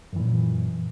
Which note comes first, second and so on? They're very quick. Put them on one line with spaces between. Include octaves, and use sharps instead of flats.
F#2 E3 A#2